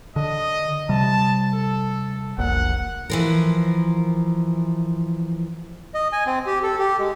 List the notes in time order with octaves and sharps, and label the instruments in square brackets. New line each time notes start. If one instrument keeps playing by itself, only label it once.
[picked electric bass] D3 [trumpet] D#5
[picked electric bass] C3 G3 [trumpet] A5
[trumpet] A4
[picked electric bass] E1 A#1 A#2 [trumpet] F#5
[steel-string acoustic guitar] E3 F3 A#4
[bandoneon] D#5
G#5
C4
G4
A4
G4
G#3